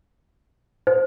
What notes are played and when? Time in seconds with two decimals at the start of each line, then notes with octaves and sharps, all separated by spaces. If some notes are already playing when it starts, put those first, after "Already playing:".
0.87 C5